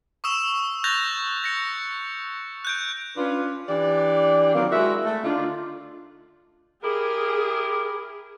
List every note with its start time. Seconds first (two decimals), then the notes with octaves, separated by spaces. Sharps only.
0.24 C#6 D#6 E6 E7
0.84 F#6 G6 A6 A#6 F7
1.43 A6 A#6 C#7
2.65 F#6 G6 D7
3.17 C#4 D4 F4 B4
3.68 E3 D4 G4 D5
4.54 D#3 F#3 A#3 C4
4.70 G#3 E4 F#4 A#4 E5
5.04 A3
5.23 D3 D4 D#4 F4
6.83 E4 G4 G#4 A#4